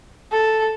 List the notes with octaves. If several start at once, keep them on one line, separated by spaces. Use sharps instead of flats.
A4